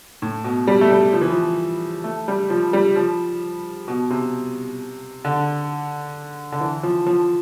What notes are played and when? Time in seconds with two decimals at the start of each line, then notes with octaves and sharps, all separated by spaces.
0.22 A2
0.44 B2
0.67 G3
0.81 A3
0.90 G3
1.13 F3
1.21 E3
1.29 F3
2.04 A3
2.28 G3
2.50 F3
2.73 G3
2.96 F3
3.88 B2
4.10 C3
5.25 D3
6.52 D3
6.61 E3
6.83 F3
7.07 F3